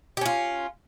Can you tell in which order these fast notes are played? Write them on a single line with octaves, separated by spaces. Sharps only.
G4 C#4 F4